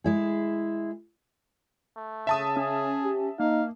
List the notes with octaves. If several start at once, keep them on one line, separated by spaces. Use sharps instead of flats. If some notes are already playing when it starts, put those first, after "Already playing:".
G#3 E4 G#4
A3
C#3 E5 A5 D#6
C#4 G#4
G4
A#3 D#4 F5